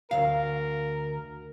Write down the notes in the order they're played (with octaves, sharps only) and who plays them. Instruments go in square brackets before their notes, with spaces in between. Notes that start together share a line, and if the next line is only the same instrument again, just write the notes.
[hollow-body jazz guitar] D2 C#3 F5 [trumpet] A#4